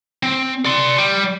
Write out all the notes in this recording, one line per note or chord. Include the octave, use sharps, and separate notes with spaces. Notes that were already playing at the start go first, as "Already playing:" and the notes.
C4
D5 C6
G3